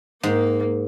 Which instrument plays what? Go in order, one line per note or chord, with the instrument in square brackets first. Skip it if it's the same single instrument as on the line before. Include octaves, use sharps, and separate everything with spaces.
[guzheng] G#2 G5 [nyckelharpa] A#3